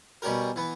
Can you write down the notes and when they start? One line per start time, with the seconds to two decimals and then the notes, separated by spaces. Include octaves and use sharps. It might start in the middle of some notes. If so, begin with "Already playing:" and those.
0.22 B2 G3 C#4 G4 A#4
0.56 E3 B3